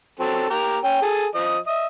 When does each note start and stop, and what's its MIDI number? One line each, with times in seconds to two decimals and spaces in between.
0.20 0.47 54
0.20 0.47 60
0.20 0.47 69
0.50 0.78 58
0.50 0.78 67
0.50 0.78 70
0.84 1.01 61
0.84 1.01 79
1.02 1.27 68
1.02 1.27 69
1.35 1.58 53
1.35 1.58 75
1.67 1.87 75
1.67 1.87 76